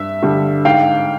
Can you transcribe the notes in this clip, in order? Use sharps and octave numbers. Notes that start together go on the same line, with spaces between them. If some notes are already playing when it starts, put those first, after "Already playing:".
Already playing: G2 E5
D3 G3
G#2 F5 G5